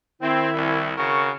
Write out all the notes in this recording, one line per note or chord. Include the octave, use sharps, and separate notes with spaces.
D#3 C4 E4
C2
C#3 F#4 A#4 C#6